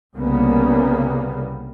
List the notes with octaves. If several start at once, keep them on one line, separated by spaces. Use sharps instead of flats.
C2 C#3 G3 A#3 B3